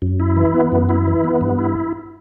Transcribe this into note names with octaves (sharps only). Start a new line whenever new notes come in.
F#2
E4
E3
B3
F#2
E4
E3
B3
G2
E4